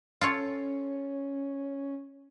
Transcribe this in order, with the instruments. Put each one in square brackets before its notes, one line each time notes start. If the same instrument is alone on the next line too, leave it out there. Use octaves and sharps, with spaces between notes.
[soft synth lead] C#4 [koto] F4 A4 C#5